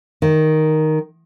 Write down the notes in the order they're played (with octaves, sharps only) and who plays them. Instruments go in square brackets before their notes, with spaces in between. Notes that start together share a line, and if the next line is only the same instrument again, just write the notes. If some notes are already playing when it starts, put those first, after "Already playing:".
[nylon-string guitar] D#3